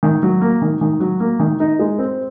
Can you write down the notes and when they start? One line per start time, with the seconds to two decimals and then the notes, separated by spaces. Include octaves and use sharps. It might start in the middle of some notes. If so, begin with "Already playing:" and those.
0.03 D#3
0.23 F#3
0.41 A#3
0.62 D#3
0.81 D#3
1.00 F#3
1.20 A#3
1.40 D#3
1.60 D#4
1.79 G#3
1.99 C4